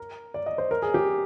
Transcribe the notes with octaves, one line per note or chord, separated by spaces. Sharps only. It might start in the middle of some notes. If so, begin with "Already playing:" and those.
Already playing: A#4
D5
D#5
C5
A#4
G#4
G4